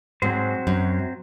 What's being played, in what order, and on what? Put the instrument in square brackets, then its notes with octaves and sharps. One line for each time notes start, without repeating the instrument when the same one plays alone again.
[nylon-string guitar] G#2 [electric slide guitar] F#3 C4 F#4 C5
[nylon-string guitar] F#2